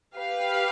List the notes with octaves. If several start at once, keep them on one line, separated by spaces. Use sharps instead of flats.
G4 B4 F5